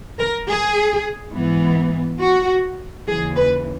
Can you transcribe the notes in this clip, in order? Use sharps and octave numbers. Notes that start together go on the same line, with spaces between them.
A#4
G#4
G#2 E3 B3
F#4
D#2 C#3 E3 G#4
B4